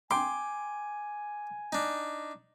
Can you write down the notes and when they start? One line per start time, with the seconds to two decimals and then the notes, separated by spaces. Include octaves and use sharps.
0.11 G5 G#5 C6 D6
1.72 D4 D#4